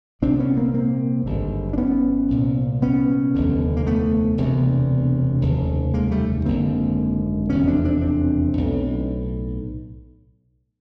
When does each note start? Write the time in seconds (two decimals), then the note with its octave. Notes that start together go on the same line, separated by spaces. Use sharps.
0.22 C2 A#2 C4 D4
0.39 B3 C#4
0.57 A#3 C4
0.74 A#3 C4
1.26 G#1 G2 D3
1.73 D4
1.78 B3 C#4
2.31 C2 A#2
2.82 B3 C#4
3.34 F1 D#2 D3
3.77 A#3
3.87 A3 B3
4.38 E1 D2 C3
5.42 F1 D#2 C#3
5.94 G#3 A#3
6.11 G3 A3
6.46 G#1 F#2 D3 A#3 C4
7.50 F1 E2 B2 B3 C#4
7.67 C4 D4
7.85 C4 D4
8.02 C4 D4
8.54 B1 A2